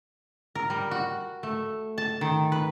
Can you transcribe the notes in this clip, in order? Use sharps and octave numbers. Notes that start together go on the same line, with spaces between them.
A#4
G3
F#4
A3
A5
D#3
B4